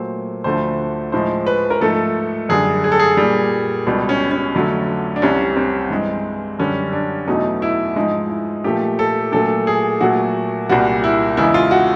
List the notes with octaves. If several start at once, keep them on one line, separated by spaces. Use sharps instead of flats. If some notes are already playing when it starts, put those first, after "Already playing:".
Already playing: A#2 F#3 A3 C5
D2 D3 F3 A3 C5
A2 F3 G#3 C5
B4
A#4
G#2 F3 A3 A4
F#2 D3 G3 G#4
G#4
A4
G#4
A#2 G3
C#2 B2 G3
C#4
C#4
F2 D3 F#3 A3
D4
C2 C3 E3 G3 C#4
C4
G2 E3 G#3
F#2 D3 G3 C#4
D4
E2 B2 F#3 A3 D#4
E4
G#2 F3 G#3 D#4
E4
A#2 F3 A3 G4
A4
A#2 F#3 A3 A4
G#4
A#2 F#3 A3 F#4
C2 A#2 G3 F#4
E4
E2 C#3 E3 G#3 E4
F4
F#4